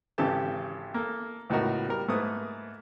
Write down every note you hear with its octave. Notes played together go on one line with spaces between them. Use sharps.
G#1 C#3 E3 G4 A4 A5
A#3 A4
C#2 A2 B3 D#4 F#4 A#4
G3 A#4
G#2 A3 A#3 B4 D#6